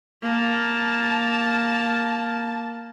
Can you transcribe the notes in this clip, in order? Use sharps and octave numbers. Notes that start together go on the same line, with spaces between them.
A#3 A5